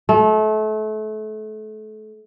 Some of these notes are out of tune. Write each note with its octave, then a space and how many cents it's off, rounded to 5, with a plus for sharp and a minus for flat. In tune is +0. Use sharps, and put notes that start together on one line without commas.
A3 -30